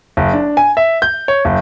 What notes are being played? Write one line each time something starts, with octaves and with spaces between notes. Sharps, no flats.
F#1
D4
G#5
E5
G6
C#5
F#1